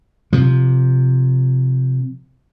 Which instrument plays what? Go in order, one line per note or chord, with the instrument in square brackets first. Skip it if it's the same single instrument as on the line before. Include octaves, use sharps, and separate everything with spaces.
[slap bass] C3 F3